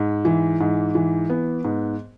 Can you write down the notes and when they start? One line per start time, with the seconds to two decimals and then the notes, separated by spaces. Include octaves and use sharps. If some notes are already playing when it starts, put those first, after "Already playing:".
Already playing: G#2
0.25 E3
0.60 G#2
0.95 E3
1.30 B3
1.64 G#2